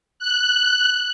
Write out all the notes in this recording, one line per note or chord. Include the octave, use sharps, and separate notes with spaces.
F#6